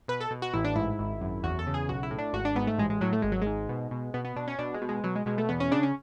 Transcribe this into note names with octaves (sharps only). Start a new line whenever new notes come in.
B2 B4
A4
B2
F#4
A1 E4
D4
G#2 E4
G#1
F#2
E2 F#4
A4
C#3
G#4
B1 F#4
E4
A2
D4
G#1 F#4
D4
G#2 B3
A3
A1 G#3
G#3
A2 F#3
A3
G#1 G#3
F#3
G#2 G#3
B2
B2
B2 B3
B3
B2 D4
C#4
B2 D4
G#3
B2
G#3
B2 F#3
G#3
B2 G#3
A3
E2 B3
C#4
C#3 D4
C#4